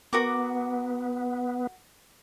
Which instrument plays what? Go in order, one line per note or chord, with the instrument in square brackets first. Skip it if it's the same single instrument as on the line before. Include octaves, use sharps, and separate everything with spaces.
[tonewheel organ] B3 [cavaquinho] F#4 A#4 D6